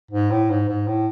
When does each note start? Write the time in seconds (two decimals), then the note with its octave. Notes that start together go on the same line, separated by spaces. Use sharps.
0.11 G#2
0.31 A2
0.50 G#2
0.68 G#2
0.87 A2